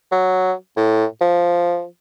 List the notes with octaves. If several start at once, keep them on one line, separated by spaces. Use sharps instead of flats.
F#3
A2
F3